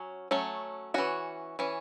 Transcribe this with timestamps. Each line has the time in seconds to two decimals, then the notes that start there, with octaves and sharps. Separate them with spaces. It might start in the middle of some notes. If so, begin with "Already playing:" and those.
Already playing: F#3 C#4
0.31 F#3 A3 C#4
0.94 E3 C#4 F#4
1.59 E3 C#4